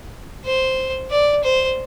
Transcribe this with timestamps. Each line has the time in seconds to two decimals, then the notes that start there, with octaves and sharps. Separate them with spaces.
0.45 C5
1.11 D5
1.44 C5